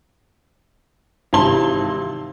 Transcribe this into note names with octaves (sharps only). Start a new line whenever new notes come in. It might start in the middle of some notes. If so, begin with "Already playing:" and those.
G#1 C3 E3 A5 C6 G7